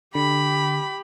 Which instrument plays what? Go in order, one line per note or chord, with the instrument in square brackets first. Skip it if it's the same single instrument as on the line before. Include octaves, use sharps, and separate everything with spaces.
[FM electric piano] D3 [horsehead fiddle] G4 [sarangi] B5